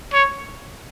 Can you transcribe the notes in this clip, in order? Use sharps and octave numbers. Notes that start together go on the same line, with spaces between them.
C#5